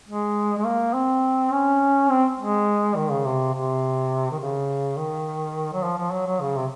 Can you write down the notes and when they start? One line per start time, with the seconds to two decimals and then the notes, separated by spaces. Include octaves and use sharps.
0.08 G#3
0.58 G#3
0.65 A#3
0.94 C4
1.52 C#4
2.10 C4
2.39 G#3
2.95 D#3
3.10 C#3
3.25 C3
3.53 C3
4.31 D#3
4.39 C#3
4.97 D#3
5.73 F#3
5.84 F3
5.97 F3
6.12 F#3
6.27 F#3
6.41 C#3
6.56 C3